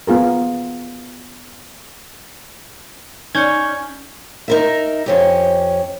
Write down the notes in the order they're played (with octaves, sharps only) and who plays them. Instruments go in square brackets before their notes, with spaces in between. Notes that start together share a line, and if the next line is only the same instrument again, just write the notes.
[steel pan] B3 F4 G#4 A#4
[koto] C#4 [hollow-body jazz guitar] D#4 D5 [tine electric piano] C#6 G6 G#6
[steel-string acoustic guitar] D#4 A#4 E5
F2 C#4 G4